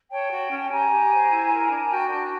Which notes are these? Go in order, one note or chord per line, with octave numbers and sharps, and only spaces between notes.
C#5 G5 A5
F#4
C#4
G4 G#5 A#5
G4
C5
E4
A#4
D4
F#4 G5 A5
D4 G5 A5